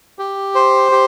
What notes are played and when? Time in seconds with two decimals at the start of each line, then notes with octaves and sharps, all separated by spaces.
0.19 G4
0.55 C5
0.92 G4